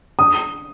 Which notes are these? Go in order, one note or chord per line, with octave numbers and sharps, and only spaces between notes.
D#6